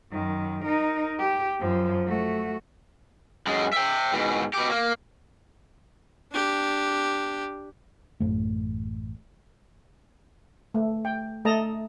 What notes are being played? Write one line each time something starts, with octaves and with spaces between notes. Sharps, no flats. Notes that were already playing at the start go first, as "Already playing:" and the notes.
F#2 D#3
D#4 A#4
G4
F#2 F3
A3 F#4
F#2 G#3
E5 G5
G#2 B2
B2 G4
A#3
D4 G4
A1 F#2 A2 A3
A3
G5
A3 A4 D#5 A5 A#5